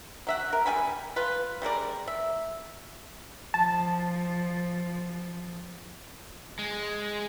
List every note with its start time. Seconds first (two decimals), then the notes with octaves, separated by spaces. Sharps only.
0.27 F#3 E5 F#5
0.53 A#4
0.66 G3 F#4 G#5 B5
1.16 F4 B4
1.62 G3 G#3 A#4 D5
2.08 E5
3.54 F3 A5
6.59 G#3